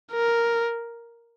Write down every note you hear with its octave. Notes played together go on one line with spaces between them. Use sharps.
A#4